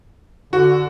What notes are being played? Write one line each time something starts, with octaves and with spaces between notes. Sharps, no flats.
D3 F#4